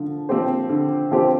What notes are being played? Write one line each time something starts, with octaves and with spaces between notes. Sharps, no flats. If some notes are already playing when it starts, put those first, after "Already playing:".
Already playing: D3 F3
F3 C4 G4 C5
D3
F3 C4 G4 C5